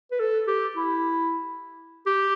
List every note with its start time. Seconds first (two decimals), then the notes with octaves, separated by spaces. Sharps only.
0.11 B4
0.19 A4
0.47 G4
0.76 E4
2.06 G4